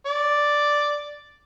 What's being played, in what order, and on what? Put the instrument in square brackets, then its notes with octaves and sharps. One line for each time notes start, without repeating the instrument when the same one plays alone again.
[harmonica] D5